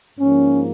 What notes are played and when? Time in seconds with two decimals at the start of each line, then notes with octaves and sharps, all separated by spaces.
0.19 G#2 F3 A#3 C#4